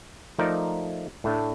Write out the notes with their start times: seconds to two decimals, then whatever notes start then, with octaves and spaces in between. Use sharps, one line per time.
0.39 F3 A3 D#4 A#4 D5
1.24 A2 A3 D4